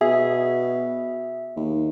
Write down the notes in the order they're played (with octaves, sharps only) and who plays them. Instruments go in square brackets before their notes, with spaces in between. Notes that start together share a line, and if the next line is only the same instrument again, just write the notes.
[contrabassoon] B2 [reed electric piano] G#4 [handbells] E5
[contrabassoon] D#2